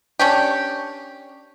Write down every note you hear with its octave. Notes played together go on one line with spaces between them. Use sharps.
C#4 D4 G4